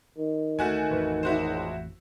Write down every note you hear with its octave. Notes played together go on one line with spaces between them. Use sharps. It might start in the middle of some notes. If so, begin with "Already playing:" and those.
D#3
D2 A3 F#4 G#5
A1 F2 B4
C#2 E4 F#4 C5